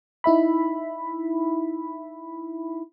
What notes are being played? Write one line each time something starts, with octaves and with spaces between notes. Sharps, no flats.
D#4 E4 E5 B5